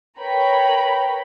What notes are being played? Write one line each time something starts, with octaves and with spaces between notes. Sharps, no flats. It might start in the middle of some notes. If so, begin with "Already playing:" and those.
A#4 B4 C#5 G5 A#5 B5